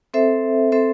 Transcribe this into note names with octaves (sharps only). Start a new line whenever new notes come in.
C4 A4 C5 E5
C4 A4 C5 E5